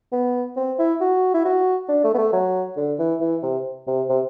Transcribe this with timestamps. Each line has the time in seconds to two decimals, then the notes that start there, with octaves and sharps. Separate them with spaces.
0.12 B3
0.56 C4
0.79 E4
1.01 F#4
1.34 E4
1.45 F#4
1.89 D4
2.04 A3
2.14 B3
2.18 A3
2.33 F#3
2.77 D3
2.99 E3
3.21 E3
3.43 C3
3.87 C3
4.09 C3